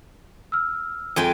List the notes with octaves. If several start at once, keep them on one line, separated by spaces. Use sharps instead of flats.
E6 F6
F2 G#3 F4 G5 D#7